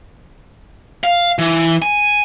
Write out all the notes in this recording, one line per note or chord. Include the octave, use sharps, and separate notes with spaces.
F5
E3
G#5